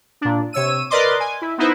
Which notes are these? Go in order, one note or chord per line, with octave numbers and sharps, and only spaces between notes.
A#2 D4
C3 C#5 E6 D#7
A#4 B4 D5 D#5 C6 D6
G#5
E4
B3 D#4 E4 B4 C5